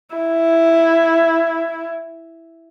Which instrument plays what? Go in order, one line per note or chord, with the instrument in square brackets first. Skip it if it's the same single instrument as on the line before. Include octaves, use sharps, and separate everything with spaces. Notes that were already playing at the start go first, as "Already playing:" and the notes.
[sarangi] E4